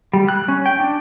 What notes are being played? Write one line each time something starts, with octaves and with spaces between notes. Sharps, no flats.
G3
F#6
C#4
G5
D4